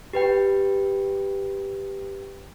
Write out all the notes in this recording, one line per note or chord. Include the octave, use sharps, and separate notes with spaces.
G4 B4 G5